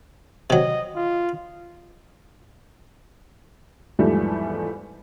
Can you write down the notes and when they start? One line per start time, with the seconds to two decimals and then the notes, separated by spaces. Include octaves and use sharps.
0.50 C3 F#3 D#5
0.96 F4
3.99 E2 G#2 F3 G3 A3